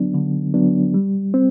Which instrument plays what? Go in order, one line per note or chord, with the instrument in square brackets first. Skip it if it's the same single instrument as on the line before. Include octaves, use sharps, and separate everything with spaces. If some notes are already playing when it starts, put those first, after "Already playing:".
Already playing: [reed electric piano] D3 F#3 B3 D4
D3
F#3 B3 D4
G3
C4